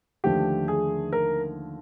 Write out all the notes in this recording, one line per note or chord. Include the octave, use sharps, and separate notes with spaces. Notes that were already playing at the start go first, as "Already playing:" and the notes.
D#2 D3 F3 A3 G4
G#4
A#4